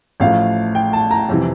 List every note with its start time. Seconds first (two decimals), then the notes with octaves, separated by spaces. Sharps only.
0.20 A1 A2 F3 A3 F5
0.75 G5
0.93 A5
1.11 A#5
1.29 F2 C3 E3